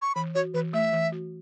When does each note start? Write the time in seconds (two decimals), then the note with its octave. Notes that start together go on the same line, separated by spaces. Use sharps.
0.02 C#6
0.15 E3 B5
0.35 F#4 C#5
0.54 E3 B4
0.73 A3 E5
0.93 E3
1.12 F#4